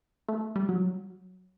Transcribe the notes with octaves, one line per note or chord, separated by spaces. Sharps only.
A3
G3
F#3